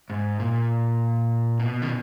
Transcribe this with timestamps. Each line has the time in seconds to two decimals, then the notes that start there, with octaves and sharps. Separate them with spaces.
0.10 G#2
0.40 A#2
1.60 B2
1.82 D#3